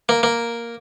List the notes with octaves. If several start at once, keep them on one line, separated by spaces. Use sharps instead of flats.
A#3
A#3